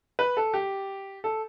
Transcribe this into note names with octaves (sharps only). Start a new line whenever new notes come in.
B4
A4
G4
A4